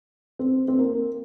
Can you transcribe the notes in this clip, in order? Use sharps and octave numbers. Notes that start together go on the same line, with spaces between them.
C4
C4
A#3